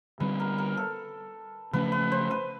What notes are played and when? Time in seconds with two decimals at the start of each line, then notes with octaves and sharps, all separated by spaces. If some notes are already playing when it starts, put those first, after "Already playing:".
0.20 D3 G3 C4 B4
0.40 A#4
0.58 A#4
0.77 A4
1.73 C#3 F3 A3 C#4 B4
1.92 B4
2.12 C5
2.31 B4